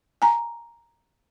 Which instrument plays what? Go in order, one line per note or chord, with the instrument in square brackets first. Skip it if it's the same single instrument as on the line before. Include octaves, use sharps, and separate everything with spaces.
[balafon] G#5 A#5